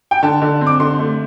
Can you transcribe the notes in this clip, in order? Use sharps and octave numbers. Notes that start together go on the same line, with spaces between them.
G5
D3 A5
D3
C4
D6
D3 C6
A3